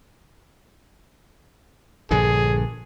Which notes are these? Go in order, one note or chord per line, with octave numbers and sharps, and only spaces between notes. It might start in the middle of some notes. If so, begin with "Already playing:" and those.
A#1 G2 D3 G#4